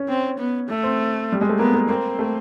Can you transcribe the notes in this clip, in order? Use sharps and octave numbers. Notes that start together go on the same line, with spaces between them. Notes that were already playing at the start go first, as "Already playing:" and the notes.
Already playing: C#4
C4
B3
A3
C4
G3
G#3
A3
A#3 B3
A#3
A#3 C4
A3